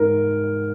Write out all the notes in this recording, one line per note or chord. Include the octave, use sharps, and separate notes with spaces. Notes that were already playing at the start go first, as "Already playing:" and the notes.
Already playing: G#2 A#4